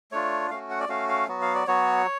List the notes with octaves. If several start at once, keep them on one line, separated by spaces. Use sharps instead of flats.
A3 D4 F4 C#5
A3 C#4 F#4 F5
F#5
D5
A3 C#4 F#4 F5
F5
F#3 B3 F#4
F5
D5
F#3 B3 F#4 C#5